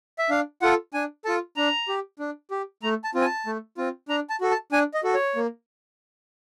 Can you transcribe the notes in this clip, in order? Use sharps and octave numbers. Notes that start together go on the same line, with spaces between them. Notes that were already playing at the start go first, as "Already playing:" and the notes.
E5
D4 F5
F4 A4 F#5
D4 G#5
F4 A4 A5
D4 A#5
G4
D4
G4
A3 A#5
A5
C4 F4
G#5
A5
A3
C4 F4
D4 A#5
A5
F#4 A4
A5
D4 G#5
D#5
F#4 A4
C#5
A#3